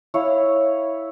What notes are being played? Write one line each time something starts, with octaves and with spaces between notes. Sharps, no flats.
E4 C#5 F5